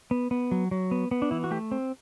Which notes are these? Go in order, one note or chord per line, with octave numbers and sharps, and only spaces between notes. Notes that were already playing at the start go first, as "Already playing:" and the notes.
B3
B3
F#3
F#3
B3
B3
D4
E3 E4
F#4
A3 G4
C4